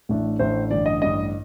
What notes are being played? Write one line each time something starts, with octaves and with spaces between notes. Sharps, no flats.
A1 A2 A3 D4
A1 A2 A3 D4 C5
A1 G2 D3 D5
D#5
A1 G2 D3 D#5